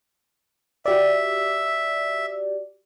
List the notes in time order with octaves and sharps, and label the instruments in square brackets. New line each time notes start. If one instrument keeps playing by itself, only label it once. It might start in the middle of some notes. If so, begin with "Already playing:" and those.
[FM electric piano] F#4 G4 D5 [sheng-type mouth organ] E5